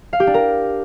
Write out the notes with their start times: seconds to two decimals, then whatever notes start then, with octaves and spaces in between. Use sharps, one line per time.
0.13 F5
0.20 G4
0.27 D4
0.34 A#4